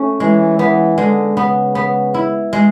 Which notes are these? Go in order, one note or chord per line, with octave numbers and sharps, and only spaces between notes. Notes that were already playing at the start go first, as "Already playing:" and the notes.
Already playing: A3 C#4
E3 G#3
E3 B3
D3 G#3
C#3 B3
B3
E4
G#3